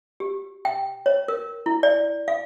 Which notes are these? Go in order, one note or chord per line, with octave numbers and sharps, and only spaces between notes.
G4
G5
C#5
A#4
E4
D5
F5